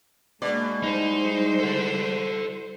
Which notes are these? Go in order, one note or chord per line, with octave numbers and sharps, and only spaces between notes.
B2 G#3 A#3 D4 D5
G3 D#4 E4 C5
A4 F#5